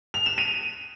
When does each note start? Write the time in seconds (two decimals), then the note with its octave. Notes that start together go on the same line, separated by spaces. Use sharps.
0.14 F7
0.26 E7
0.38 D#7